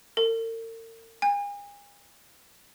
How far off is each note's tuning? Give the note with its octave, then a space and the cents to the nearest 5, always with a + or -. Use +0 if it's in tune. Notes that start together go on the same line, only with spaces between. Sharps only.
A#4 -45
G#5 -40